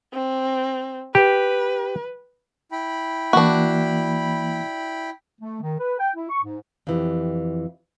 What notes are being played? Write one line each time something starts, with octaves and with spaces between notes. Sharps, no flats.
C4
G4 B4
E4 G5 B5
E3 A#3 D4 F#4
A3
D#3
B4
G5
E4
C#6
G#2
F2 E3 G4